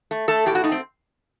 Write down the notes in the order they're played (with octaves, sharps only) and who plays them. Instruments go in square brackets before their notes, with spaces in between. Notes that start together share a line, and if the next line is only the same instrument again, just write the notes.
[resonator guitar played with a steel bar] A3
A3 A4
A2 G4
F#4
A3 D#4
C4